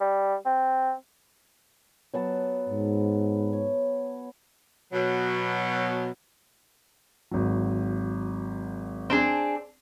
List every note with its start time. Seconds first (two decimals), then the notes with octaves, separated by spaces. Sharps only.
0.01 G3
0.46 C4
2.14 F#3 B3 A5
2.69 G#2
3.53 C#5
4.93 B2 F#3
7.31 G#1 F#3
9.10 C4 D4 G#4